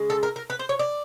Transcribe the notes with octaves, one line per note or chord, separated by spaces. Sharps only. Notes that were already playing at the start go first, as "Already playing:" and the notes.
Already playing: C#3 G#3
A4
A#4
A#4
B4
C5
C#5
D5